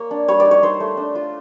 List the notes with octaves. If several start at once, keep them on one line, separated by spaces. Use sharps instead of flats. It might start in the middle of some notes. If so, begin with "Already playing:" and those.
Already playing: A#3 C#5
D4
G3 C#5
D5
D#4
C#5
D#4 C5
A3
D4
F4